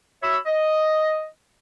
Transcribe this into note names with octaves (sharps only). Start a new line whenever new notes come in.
F#4 C#5 E5 B5 E6
D#5